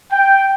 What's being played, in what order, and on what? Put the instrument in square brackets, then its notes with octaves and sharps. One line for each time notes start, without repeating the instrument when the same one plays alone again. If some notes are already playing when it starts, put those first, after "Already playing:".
[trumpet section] G5